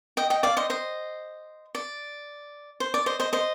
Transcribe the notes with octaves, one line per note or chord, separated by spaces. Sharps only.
D#5 G5
D#5 G5
D5 F5
C5 D#5
C5 D#5
D5
C5
D5
C5 D#5
C5 D#5
C5 D#5